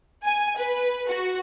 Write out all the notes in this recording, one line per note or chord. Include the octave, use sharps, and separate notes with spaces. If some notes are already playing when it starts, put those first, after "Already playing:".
G#5
B4
F#4